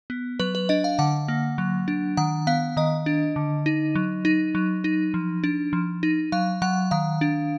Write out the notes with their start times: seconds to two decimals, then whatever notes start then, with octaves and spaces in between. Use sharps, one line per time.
0.10 B3
0.40 F#3 B4
0.55 B4
0.69 D4 D#5
0.84 F5
0.99 D3 F#5
1.28 A#3
1.58 F#3
1.88 D4
2.17 D#3 F#5
2.47 B3 F5
2.77 D#3 D#5
3.06 D4
3.36 D3
3.66 D#4
3.95 F#3
4.25 D#4
4.55 F#3
4.84 D#4
5.14 F3
5.44 D4
5.73 F3
6.03 D#4
6.32 F#3 F5
6.62 F#3 F#5
6.91 D#3 F5
7.21 D4